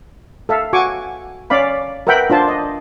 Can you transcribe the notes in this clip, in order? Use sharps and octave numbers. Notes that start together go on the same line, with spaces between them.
A4 E5 F5
F#4 G#5 C#6 D6
C#4 D5 F5 B5
A#4 B4 E5 F#5 G5 B5
D4 F4 C5 A5
D#5